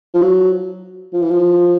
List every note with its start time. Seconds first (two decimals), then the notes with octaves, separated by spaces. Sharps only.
0.14 F3
0.22 F#3
1.13 F3
1.22 E3
1.31 F3